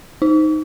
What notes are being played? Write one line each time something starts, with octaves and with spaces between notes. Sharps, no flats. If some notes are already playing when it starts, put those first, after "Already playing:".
D#4